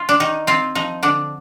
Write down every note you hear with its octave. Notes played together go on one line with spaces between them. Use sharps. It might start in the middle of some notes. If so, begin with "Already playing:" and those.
Already playing: F4
D4
D#3 D#4
C4 F4
F3 D#4
D3 D4